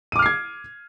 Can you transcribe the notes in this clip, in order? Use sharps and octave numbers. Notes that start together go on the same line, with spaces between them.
D6 F6 G#6 C7 D#7